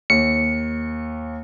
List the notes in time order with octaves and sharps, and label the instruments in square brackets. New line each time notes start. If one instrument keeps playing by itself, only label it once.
[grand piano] D#2 [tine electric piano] C#7